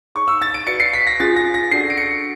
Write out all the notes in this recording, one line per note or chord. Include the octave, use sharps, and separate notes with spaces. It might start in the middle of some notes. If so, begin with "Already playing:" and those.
D#4 G#4 C#5 C#6
E6
A6
D7
F#4 B4 D5 F5 C#7
C7
B6
A#6
C#4 F4 G#4 A6
A#6
A#6
D4 F#4 A4 D5 F#5 C7
D7
C#7